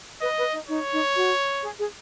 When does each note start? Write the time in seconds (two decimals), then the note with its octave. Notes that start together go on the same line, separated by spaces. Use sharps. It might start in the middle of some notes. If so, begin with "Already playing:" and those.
0.21 B4 D#5
0.37 B4
0.52 D#4
0.68 D#4 C#5
0.92 D#4
1.15 F#4
1.62 G#4
1.79 G#4